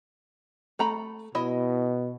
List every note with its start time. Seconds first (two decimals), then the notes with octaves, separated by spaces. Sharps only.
0.79 A3 A#5 B5
1.35 B2 E4 D#5